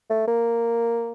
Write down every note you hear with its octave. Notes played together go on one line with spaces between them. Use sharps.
A3
A#3